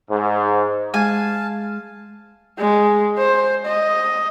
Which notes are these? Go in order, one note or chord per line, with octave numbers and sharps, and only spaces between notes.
G#2
G#3 F5 G#5 A5
G#3
C5
D#5